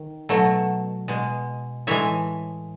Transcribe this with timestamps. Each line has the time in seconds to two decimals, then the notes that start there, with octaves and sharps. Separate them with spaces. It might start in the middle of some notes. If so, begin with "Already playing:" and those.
Already playing: D#3
0.29 B2 F#3 A3
1.08 B2 G#3
1.87 A2 E3 G#3 C#5 E5